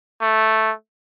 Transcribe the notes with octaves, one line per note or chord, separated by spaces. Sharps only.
A3